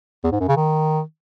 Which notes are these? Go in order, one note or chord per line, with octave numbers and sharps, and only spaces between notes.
E2
G#2
F#2
C#3
D#3